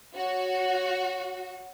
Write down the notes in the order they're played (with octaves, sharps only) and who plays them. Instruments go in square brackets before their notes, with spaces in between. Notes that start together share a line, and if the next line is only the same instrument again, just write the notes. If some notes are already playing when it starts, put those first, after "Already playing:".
[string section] F#4 [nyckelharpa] C#5